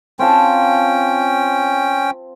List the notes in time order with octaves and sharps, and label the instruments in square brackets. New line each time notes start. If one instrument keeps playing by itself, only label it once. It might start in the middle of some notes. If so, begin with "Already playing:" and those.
[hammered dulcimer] C4 F4 A5 [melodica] C#4 G5